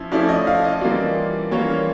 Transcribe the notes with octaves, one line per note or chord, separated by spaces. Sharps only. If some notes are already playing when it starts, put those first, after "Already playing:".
Already playing: F3 C#4 E4
F3 A3 C#4 E4 D5
D#5
F5
D#5
E3 G3 A#3 C#4 F4 D5
E3 G3 A#3 C#4 F4 C#5